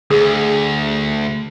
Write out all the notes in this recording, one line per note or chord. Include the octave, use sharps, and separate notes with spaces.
D2 G#4 D#6